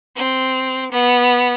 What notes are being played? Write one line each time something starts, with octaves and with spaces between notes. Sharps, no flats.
C4
B3